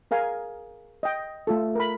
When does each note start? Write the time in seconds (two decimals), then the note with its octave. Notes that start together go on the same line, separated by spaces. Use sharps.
0.11 G#4 A#4 F5 G#5
1.03 D#5 G5
1.47 A3 F4 A4
1.75 A#4 B5